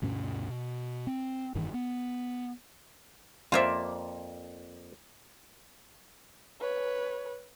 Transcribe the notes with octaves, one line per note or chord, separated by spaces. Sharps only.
D2 G2 B2 C#4
B2
C4
F1 G2 D#3 E3
B3
F2 A#3 F4 C5 D5 E5
B4 C#5